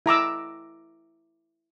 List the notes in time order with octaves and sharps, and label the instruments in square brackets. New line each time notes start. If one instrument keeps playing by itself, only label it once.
[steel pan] E4 A#5 D6 E6